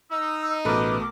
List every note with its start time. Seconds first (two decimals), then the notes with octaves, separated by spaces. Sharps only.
0.10 D#4 E6
0.65 A1 B2 A3 A#4 B4 D6